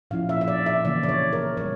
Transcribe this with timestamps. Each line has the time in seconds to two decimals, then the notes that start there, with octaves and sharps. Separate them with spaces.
0.11 A#2 F3 C#4 E4 F5
0.29 E5
0.41 E5
0.48 D5
0.66 E5
0.85 C#3 E3 A#3 E4 D5
1.03 D5
1.09 C#5
1.33 A#4
1.57 A#2 G3 C#5